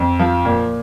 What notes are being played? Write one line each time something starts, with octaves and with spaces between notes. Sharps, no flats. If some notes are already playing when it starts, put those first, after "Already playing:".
Already playing: F2
F3
A#2